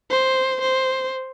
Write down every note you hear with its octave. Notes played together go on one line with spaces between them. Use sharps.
C5
C5